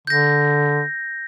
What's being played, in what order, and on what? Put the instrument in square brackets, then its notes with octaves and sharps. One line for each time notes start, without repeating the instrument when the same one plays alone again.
[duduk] D3 [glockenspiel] G6 A#6